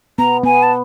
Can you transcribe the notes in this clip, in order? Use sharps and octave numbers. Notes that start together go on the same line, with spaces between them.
B3 A#5
B3 G#5
A5